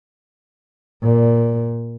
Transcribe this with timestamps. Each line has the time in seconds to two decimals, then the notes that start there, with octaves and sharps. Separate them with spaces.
1.03 A#2